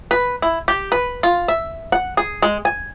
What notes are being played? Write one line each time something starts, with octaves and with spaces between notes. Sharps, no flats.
B4
E4
G4
B4
F4
E5
F#5
G#4
G#3
G#5